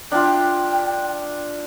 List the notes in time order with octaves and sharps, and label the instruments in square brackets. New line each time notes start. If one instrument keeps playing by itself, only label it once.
[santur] D4 F4 [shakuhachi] G5